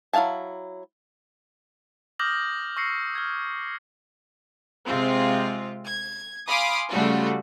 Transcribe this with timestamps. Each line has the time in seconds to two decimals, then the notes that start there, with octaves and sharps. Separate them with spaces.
0.13 F#3 E4 F5 G#5 A5
2.19 D6 D#6 F6 G6 A#6 F#7
2.77 C#6 E6 A#6 C7 C#7
3.15 F6 G#6
4.85 C3 G#3 C4 F4
5.86 G#6
6.48 F5 G#5 B5 C6 D6 D#6
6.91 C#3 G3 A3 F4 F#4